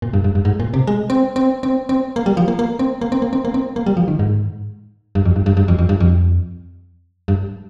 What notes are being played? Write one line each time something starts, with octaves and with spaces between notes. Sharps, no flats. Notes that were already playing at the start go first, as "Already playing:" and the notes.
A#2
G2
G2
G2
G#2
A#2
C3
G#3
C4
C4
C4
C4
A#3
G3
F3
A#3
A#3
C4
A#3
C4
A#3
C4
A#3
C4
A#3
G3
F3
D#3
G#2
G2
F2
G2
G2
G2
F2
F2
G2
F2
G2